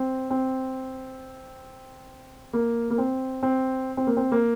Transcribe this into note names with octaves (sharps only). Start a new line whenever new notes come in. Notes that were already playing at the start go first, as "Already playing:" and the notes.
Already playing: C4
C4
A#3
A#3
C4
C4
C4
A#3
C4
A#3